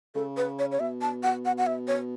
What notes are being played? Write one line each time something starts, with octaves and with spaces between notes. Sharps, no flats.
C#3 A4
B4
C#5
C#5
B2 E5
A5
F#5
F#5
F#5
E5
C#5